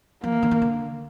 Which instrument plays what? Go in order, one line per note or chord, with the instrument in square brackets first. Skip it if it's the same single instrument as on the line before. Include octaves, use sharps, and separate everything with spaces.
[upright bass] F3 [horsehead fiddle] A#3
[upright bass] E3
D3
D#3
D3